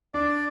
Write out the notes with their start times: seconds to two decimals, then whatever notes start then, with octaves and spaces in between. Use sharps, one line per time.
0.14 D4 D5